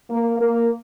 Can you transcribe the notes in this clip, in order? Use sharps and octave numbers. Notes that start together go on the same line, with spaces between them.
A#3
A#3